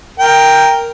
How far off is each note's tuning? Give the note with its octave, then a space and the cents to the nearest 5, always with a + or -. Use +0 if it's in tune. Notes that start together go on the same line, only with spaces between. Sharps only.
A#4 +0 G5 +10